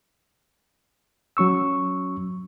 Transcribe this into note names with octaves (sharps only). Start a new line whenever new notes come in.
F#3 C#4 C#6 E6